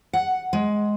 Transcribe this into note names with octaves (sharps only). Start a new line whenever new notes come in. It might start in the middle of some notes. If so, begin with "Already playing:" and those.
F#5
G#3